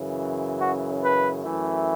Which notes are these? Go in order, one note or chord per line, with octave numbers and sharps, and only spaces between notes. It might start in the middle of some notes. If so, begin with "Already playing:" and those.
Already playing: F#2 C#3 E3
F#4
B4
F#2 E3 A3